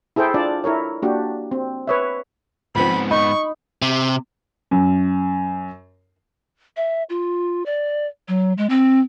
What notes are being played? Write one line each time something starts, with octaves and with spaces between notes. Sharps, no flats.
E4 G#4 A4 C5 G5
D4 F4 D5 A5
E4 A4 A#4 C#5
A#3 D4 F#4 G4
C4
B4 C#5 E5
G#2 F3 B3 C4 B5
D#4 B5 C#6
C3
F#2
E5
F4
D5
F#3
G#3
C4